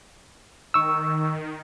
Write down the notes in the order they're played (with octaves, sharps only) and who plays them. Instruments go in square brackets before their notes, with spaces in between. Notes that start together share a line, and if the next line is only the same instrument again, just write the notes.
[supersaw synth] D#3 [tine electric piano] C#6 E6